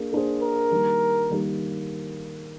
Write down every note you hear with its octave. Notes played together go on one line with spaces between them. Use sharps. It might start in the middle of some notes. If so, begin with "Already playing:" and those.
Already playing: A#3 D4 G#4
A#3 D4 G#4 C5
A#4
D#3 G3 A#3
D#3 G3 A#3